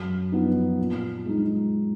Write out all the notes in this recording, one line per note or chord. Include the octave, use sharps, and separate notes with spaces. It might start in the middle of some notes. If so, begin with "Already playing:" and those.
Already playing: F#2
F3 B3 D#4
A#2
G#3 D#4